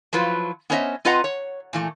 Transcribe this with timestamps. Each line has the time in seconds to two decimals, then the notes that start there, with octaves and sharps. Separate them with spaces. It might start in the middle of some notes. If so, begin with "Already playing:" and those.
0.13 F3 F#3 E4 F4 B4
0.70 B3 C#4 C5 C#5 D#5 E5
1.05 C4 F4 B4 D#5 F#5 A#5
1.24 C#5
1.73 A#2 E3 A3